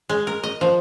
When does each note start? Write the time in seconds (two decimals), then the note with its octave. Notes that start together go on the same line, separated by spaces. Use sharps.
0.09 G#3
0.27 A#4
0.43 D#5
0.61 F3